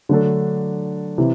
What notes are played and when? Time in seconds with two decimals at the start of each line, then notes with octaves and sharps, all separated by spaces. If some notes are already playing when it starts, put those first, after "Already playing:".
0.09 D3 F#3 A3 D4 A4
1.18 C3 E3